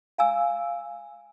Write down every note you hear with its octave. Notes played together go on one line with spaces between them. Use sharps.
F5 G#5 E6